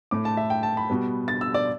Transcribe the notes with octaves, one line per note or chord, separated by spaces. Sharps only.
A2 A3 D6
A5
E5
G5
A5
B5
B2 G3 B3
A6
E6
D5